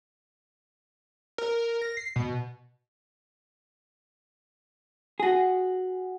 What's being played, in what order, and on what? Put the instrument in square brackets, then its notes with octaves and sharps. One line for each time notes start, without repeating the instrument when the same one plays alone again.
[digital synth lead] A#4
A#6
C7
B2
[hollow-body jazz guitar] F#4 G#4